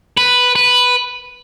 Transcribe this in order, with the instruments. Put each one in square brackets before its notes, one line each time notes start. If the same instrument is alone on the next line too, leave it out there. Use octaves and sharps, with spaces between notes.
[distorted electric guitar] B4
B4